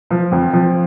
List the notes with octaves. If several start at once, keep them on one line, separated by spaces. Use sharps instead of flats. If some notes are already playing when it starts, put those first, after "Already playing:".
F3
F2
F3